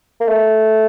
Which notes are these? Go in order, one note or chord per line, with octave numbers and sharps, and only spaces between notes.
A#3
A3